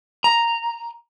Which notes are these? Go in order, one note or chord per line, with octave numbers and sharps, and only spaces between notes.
A#5